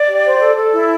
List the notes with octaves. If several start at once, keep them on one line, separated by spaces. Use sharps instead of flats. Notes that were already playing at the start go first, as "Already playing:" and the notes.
Already playing: D5
G4
C5
A4
A4
E4